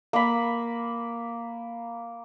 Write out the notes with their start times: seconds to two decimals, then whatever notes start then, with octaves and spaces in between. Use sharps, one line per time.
0.13 A#3 B5